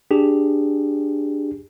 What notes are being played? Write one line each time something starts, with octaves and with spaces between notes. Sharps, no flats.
D4 G4 G#4